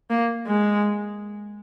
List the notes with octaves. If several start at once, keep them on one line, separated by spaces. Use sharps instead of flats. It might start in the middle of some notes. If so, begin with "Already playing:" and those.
A#3
G#3